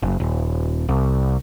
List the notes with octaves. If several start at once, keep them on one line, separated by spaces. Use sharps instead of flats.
F#1
D#1
C2